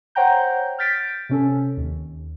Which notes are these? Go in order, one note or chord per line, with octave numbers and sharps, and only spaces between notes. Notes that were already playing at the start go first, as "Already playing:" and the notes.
C5 C#5 F#5 G5 A#5 G6
F6 G6 A6 B6 D7
C3 C#4 A4
D#2